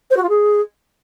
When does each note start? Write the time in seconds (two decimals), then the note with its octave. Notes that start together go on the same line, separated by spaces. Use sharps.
0.10 C5
0.17 F#4
0.23 F4
0.29 G#4